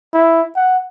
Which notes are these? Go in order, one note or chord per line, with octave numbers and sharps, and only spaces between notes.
E4
F#5